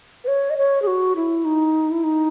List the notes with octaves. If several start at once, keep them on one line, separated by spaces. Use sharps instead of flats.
B4
C#5
D#5
C#5
G#4
F#4
E4
D#4
E4
D#4